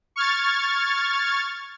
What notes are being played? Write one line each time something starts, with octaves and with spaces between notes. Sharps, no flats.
C#6 F6 G#6 A6